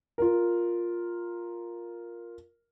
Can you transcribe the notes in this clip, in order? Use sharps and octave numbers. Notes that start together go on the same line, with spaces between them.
F4 A#4